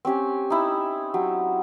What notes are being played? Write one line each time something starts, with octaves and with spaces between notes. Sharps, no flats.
C4 C#4 G4 G#5
D#4 E4
F#3 G4